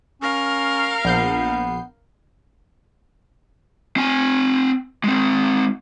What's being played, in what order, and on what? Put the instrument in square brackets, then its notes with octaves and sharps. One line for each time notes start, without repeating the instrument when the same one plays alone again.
[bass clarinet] C#4 [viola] A#4 F5
[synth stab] A#1 G6 C7 [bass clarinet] B3
[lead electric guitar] C4 G#5
G#3 C4